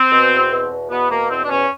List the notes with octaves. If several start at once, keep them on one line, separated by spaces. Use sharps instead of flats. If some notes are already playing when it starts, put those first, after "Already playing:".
Already playing: C4
B2
E2
B2
E2
B2 B3
B2 A#3
E2 C4
D4
E2 C#4